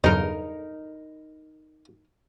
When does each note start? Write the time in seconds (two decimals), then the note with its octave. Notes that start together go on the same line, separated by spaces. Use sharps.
0.04 B1 E2 G2 C#3 D#4 A#4 D#5 C6